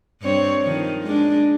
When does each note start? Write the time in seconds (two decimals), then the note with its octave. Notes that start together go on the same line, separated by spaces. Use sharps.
0.21 G2 C4 C#5
0.63 D#3 F3
1.03 G#3 D4